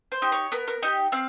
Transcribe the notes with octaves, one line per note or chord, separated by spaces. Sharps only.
C5
D#4 G4
C#5
B3 A#4
A#4
D#4 G4 D#5
C4 F5